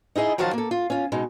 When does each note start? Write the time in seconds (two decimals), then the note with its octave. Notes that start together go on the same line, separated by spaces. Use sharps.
0.16 D#4 E4 G#4 D#5
0.38 D#3 F3 F#3 F#4 F5 A5
0.53 A#3 A4
0.71 F4
0.90 C#4 F4
1.12 B2 G#3 D#4